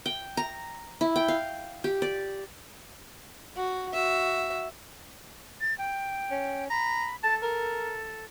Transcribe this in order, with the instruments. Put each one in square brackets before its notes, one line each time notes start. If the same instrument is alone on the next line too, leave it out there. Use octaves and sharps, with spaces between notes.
[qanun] G5
A#5
E4
G5
F5
G4
D5
[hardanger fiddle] F#4
F#4 E5
[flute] A6
G5
[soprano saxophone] C#4
[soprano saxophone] A#5 [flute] B5
[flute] A4 [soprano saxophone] A5
[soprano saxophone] A#4